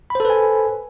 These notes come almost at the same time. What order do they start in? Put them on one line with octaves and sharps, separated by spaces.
B5 C5 A4 B4 G#5